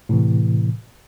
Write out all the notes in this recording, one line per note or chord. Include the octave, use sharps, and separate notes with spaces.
A2 C3 E3